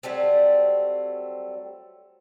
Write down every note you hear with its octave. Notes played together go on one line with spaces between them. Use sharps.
F#3 G3 A3 C4